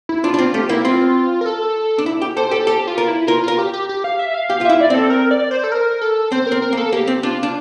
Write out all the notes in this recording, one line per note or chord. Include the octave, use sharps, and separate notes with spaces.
E4
D4 F4
D4
C4 F4
A3 G4
A#3 E4
C4 F4
A#4
A4
D4
E4
G4
A4 C5
G4 A4
G4 A4
F4
A#4
E4
F4 A#4
F4 A#4
G4
G4
G4
F5
E5
F5
G4 F5
F4
E4 E5
D5
C4 A4
A#4
D5
C5
A4
A#4
A4
C4 C5
A#4
C4
A#4
A#3
A4
A#3 G4
C4
D4 F4
D4